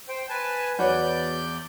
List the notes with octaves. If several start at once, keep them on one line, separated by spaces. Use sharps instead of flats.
C5 G5
B4 G#5 A5
E2 F#4 B4 C#5 D5 G6